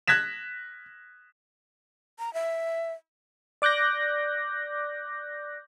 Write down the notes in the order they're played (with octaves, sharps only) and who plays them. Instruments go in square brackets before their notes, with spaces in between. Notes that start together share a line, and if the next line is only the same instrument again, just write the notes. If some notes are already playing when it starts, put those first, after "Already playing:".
[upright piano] F#6 G#6 A#6 B6 E7
[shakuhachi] A#5
E5
[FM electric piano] D5 D6 F#6 G6 A#6